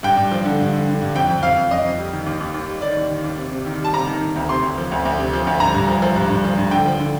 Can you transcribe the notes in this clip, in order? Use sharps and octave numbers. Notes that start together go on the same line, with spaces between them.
G2 G5
G2
F3
D3
G2
D3
D3
G2
F2 G5
F2
F2 F5
F2
F2 D#5
F2
G3
D#3
D#2
D#2
D#2
G3
D#3 D5
D#2
D#3
D#2
C3
C3
D#3
G3 A5
C3 A#5
D#3
D#3
D2
C3 C6
D2
F3
D2
D2
C3
F3
D2
G2 A#5
G2
F3
F3
G2
G2
F3
G2
D3 G5
F3
D3